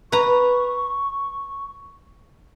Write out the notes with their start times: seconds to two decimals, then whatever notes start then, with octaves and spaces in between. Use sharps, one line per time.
0.12 B4 A#5 C#6